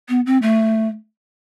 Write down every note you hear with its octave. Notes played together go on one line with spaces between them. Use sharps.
B3
C4
A3